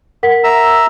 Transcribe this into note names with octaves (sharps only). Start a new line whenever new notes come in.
A#4 F#5 B6
E5 A#5 E6